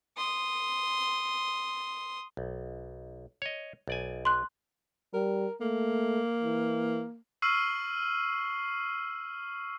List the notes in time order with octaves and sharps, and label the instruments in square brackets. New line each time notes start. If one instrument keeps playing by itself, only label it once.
[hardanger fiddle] C6 D#6
[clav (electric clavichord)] B1
C#5 D#5
B1 D5 G#5
[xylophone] C6 F#6
[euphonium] G3 [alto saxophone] A#4
[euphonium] A3 [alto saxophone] A#3
[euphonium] E3
[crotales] C#6 E6 F6 C7 D#7 F#7